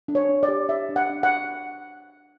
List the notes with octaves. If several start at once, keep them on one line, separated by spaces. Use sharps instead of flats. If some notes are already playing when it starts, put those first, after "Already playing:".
D4
C#5
D4
D5
G4
C#5 E5
D4
F#5
D4
F#5